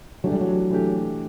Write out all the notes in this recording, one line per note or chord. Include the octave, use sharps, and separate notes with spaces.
E3 F#3 A3 D4 G4
G3
F#3
E3 A3 D4 G4